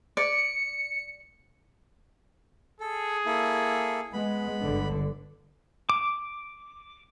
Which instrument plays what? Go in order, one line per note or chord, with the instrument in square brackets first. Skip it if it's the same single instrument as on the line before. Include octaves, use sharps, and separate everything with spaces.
[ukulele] D5 [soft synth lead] C#7
[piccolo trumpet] G#4 [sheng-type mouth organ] A4
[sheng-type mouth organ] A#3 E4 A4
[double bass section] G#3 [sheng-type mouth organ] B3 B5
[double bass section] G1 D3
[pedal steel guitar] D6